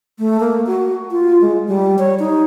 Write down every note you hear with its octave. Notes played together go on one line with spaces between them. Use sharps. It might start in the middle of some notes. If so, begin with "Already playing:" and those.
A3
A#3
F#4
F4
G#3
G3
C#5
D#4